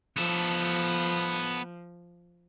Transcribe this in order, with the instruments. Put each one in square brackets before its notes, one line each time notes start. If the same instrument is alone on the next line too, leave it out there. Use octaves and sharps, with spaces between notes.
[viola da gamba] F3 [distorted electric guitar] B3 A4